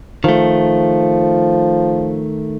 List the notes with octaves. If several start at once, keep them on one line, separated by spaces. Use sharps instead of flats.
D#3 F3 A3